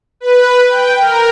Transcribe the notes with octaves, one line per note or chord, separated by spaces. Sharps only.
B4
G5
A#4